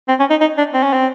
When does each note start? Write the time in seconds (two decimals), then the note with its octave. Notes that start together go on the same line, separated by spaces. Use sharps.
0.08 C4
0.19 C#4
0.30 D#4
0.41 D#4
0.58 D4
0.74 C4
0.83 C#4
0.93 C4